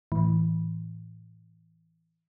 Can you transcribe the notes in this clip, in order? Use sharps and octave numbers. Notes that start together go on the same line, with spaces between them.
A2 E3